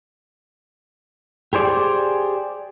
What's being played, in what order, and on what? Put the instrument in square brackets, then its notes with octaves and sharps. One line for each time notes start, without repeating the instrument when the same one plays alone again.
[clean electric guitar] G4 G#4 C5 D5